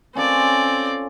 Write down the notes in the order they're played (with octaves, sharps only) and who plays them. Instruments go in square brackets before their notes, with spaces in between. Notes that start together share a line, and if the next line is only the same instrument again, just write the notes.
[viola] C4 D5 [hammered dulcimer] C#4 F4 A4